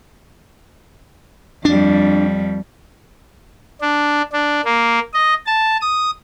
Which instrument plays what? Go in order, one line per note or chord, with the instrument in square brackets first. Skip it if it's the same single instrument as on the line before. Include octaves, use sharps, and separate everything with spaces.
[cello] F2 G3 [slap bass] D4
[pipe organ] D4
D4
A#3
D#5
A5
D#6